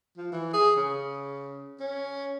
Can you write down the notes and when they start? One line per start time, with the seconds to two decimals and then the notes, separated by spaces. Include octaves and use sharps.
0.17 F3
0.32 E3
0.53 G#4
0.76 C#3
1.80 C#4